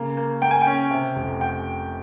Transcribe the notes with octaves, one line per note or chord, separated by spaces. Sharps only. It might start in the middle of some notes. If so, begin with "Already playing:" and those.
Already playing: C#3 A#3
A#3
A#3 G5
G#5
G5
C#4
C3
F1
G5